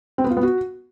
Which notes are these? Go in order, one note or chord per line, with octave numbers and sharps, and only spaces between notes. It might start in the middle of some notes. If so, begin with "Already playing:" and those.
C4
B3
F4
B3
F#4